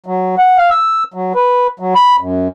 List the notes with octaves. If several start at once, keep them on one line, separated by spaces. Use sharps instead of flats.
F#3
F#5
F5
E6
F#3
B4
F#3
B5
F#2